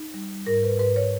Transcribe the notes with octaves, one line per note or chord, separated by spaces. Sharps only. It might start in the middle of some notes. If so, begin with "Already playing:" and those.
Already playing: D#4
G3
G#2 A#4
B4
G#2 B4
C#5